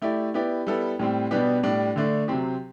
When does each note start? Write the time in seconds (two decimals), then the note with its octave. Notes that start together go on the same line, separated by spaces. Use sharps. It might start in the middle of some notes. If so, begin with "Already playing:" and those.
0.02 A3 E4 G4 D5
0.34 B3 E4 G4 D5
0.67 G3 B3 E4 A4
0.99 A2 G3 C4
1.31 B2 G3 B3 D4 G4
1.63 A2 G3 D4
1.96 D3 A3 D4
2.28 C3 F#3 C4 G4